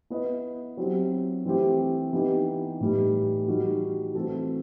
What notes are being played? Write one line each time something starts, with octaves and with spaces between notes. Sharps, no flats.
B3 E4 B4 D#5
F#3 C4 E4 G4
E3 A3 C4 E4 G4
E3 B3 D#4 G4
A2 E3 G3 D#4
E3 G3 D#4 F#4
E3 A3 C4 F#4 A4